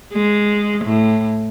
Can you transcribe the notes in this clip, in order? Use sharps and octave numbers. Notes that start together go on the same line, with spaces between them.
G#3
A2